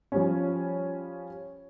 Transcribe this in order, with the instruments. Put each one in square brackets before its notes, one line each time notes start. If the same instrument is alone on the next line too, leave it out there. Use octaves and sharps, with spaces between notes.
[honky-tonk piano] F3 G3 C#4